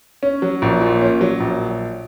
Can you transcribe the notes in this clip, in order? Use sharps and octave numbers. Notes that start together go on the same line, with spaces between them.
C#4
F#3
A#1
A#2
C#4
F#3
A#1